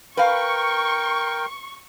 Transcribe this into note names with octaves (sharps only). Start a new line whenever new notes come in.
A#4 B4 F5 G5 C#6